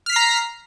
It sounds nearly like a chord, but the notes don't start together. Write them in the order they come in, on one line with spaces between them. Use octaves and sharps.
F6 B6 C7 A#5